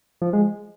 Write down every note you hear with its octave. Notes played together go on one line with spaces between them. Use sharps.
F3
G#3